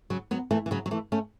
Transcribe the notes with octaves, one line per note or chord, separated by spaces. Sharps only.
C#3 F#3
F#3 B3
E3 A3
E3
C#3 F#3
F#3
E3 A3
A3 C#4